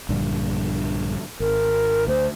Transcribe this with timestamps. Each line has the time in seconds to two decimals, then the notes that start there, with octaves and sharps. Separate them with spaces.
0.09 A#1 G2 D3
1.40 G#1 A#4
2.08 D2 C5